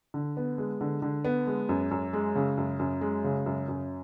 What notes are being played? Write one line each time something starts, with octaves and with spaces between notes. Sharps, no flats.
D3
B3
G#3
D3
D3
B3
G#3
F#2
F#2
G#3
C#3
F#2
F#2
G#3
C#3
F#2
F#2